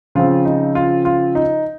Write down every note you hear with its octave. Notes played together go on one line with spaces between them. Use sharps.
C#3 F3 C4 F4
D#4
F4
F4
D#4